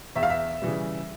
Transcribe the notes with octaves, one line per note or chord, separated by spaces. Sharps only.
E2 E5
F5
E5
C#3 E3 G3